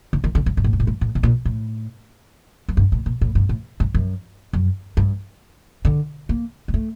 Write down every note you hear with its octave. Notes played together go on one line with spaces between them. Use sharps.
D3
D#3
D3
G2
G2
A2
G2
A2
G2
A2
C3
A#2
A2
F#2
G2
A2
A#2
A2
G2
A2
G2
F#2
F#2
G2
D3
A#3
G3
A3